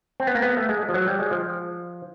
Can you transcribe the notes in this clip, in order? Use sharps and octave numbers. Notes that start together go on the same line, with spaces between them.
C4
B3
A#3
B3
A3
G#3
F3
F#3
G3
G#3
F3